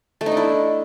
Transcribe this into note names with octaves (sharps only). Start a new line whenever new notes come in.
A3
D#4
D4
E4